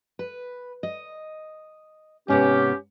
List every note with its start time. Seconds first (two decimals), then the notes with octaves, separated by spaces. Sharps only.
0.19 B4
0.83 D#5
2.28 G#2 C3 B3 C#4 G4